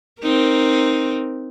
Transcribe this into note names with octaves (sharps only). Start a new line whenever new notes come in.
C4 D#4 A#4